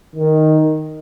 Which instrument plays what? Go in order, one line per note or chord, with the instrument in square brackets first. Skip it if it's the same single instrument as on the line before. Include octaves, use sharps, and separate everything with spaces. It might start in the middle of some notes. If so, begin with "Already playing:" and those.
[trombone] D#3